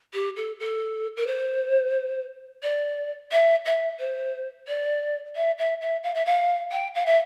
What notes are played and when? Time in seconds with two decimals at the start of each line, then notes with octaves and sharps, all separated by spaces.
0.13 G4
0.36 A4
0.59 A4
1.16 A#4
1.26 C5
2.62 D5
3.31 E5
3.65 E5
3.99 C5
4.67 D5
5.35 E5
5.58 E5
5.80 E5
6.03 F5
6.14 E5
6.25 F5
6.71 G5
6.94 F5
7.05 E5